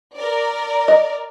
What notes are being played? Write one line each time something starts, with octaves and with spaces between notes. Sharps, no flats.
A#4 D5
D#5